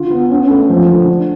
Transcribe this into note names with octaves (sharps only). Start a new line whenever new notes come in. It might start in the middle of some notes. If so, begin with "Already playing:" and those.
Already playing: D3 F4
B3
C#4
A3
F3
D3
D4